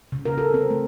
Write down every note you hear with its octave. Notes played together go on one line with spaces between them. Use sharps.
C#3
A#4
A4
C4
A3